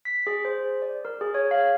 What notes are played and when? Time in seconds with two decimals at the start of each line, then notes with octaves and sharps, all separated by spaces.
0.05 B6
0.27 G#4
0.45 C5
0.82 D5
1.05 A#4
1.21 G#4
1.34 C#5
1.51 F5